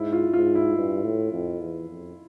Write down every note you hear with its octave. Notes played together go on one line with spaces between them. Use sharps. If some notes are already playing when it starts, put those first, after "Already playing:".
Already playing: G#2 E4
F4
G#2 F4
E4
G2
A2
F2
E2
F2